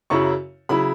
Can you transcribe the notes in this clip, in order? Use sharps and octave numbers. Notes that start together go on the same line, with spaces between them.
F#2 C#3 F#3 E4 C#6
C#3 F#3 E4 B5